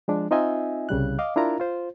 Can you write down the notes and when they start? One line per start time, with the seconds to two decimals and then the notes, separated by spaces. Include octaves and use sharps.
0.08 F3 G#3 D4
0.31 C4 D#4 F4 D#5 E5 G#5
0.89 C2 C#3 G3 F#6
1.19 D#5 F5 D6
1.36 D4 E4 F4 A#4 A#5
1.60 F4 C5